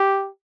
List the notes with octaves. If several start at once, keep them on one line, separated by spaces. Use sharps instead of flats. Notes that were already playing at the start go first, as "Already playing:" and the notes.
Already playing: G4